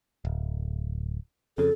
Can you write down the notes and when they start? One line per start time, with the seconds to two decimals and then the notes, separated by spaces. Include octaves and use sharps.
0.25 D1
1.58 F2 C#3 A4